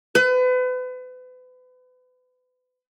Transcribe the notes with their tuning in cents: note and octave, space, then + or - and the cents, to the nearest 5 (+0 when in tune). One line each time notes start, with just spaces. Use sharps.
B4 +35